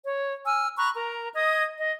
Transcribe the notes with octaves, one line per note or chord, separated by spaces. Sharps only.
C#5
G#5 E6 F6
A#5 B5 C#6 F#6
A#4 A#5
D#5 D#6 G#6
D#5